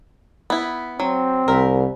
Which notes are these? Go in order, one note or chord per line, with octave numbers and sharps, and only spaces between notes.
B3 E4
F#3 C4
C2 A#4 E5